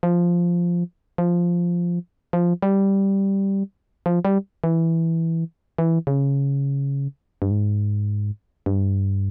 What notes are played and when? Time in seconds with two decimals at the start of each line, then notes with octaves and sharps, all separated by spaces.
0.03 F3
1.18 F3
2.33 F3
2.62 G3
4.06 F3
4.25 G3
4.64 E3
5.78 E3
6.07 C#3
7.42 G2
7.51 G#2
8.66 G2